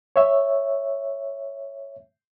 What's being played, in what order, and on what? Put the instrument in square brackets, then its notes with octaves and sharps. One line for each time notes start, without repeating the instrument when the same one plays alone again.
[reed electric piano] C#5 E5